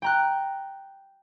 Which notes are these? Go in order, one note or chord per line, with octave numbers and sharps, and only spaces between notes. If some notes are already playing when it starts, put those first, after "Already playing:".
G5 A#5 F#6